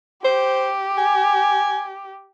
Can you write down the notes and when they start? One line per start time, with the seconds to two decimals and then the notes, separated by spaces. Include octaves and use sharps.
0.25 G4 C5
0.98 G#5